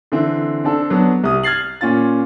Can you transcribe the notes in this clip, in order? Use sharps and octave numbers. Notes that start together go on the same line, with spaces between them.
D3 E3 C4
C4 D4 A4
F#3 B3 D4
C2 D#6
F6 G#6 A6 C7 F#7
A#2 C#4 F4 A6